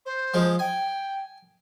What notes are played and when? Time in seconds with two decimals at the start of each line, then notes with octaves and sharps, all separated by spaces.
0.05 C5
0.34 F3 G#3
0.59 G5 G#5